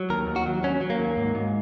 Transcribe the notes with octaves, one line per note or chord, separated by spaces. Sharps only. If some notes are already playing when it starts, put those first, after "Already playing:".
Already playing: F#3
D#2 A#4
D#2
F#4
F#3
F#3 C#4
F#3
A#3
D#2
G#2
G#2